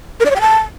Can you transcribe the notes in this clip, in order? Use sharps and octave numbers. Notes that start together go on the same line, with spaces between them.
A#4
D5
C#5
G5
A5